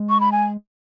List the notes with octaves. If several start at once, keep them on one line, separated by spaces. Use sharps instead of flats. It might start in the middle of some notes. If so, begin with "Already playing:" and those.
Already playing: G#3
C#6
B5
G#5